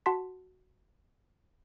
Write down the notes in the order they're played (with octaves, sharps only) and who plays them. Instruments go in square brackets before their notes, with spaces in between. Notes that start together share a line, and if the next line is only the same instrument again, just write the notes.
[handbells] F#4 F#5 A5 C6 B6